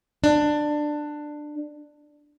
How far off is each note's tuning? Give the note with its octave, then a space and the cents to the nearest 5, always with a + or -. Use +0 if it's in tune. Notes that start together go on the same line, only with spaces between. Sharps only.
D4 +15